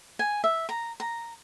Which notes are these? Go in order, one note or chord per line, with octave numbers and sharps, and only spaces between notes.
G#5
E5
A#5
A#5